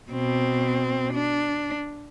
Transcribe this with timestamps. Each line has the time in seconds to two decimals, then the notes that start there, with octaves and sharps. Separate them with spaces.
0.11 B2 C4
1.14 D4